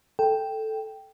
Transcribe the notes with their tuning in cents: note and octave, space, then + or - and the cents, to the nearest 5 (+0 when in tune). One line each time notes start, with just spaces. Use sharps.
A4 +0 G5 +0